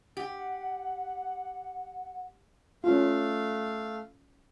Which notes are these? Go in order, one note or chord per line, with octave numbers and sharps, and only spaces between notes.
G4 F#5
A3 C#4 F4 F5